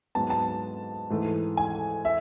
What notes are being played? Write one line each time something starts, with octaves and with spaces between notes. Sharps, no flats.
G#2 F#3 B3 A5
A5
G#2 E3 A3
G#5
E5